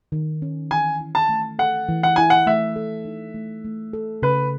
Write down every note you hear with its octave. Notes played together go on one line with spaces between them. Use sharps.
D#3
C#4
E3 G#5
E4
A5
A3
A4 F#5
E3
F#5
E4 G#5
F#5
A3 E5
A4
D#4
A3
A3
A4
C#3 B4